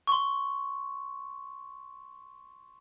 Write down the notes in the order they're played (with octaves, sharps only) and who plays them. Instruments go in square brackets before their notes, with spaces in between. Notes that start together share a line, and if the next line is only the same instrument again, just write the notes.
[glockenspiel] C6 C#6